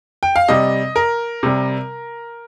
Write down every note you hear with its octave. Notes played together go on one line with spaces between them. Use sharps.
G5
F5
C3 G3 D#5
A#4
C3 G3